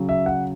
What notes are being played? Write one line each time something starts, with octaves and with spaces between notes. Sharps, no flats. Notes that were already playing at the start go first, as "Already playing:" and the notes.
Already playing: C#3 F#3
E5
F#5